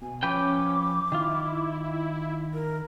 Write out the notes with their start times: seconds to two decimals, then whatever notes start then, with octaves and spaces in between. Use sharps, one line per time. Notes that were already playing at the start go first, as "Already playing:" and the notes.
0.02 B2 G#5
0.23 F3 C#4 B4 G5 D6
1.12 D#3 E4 F4
2.54 A#4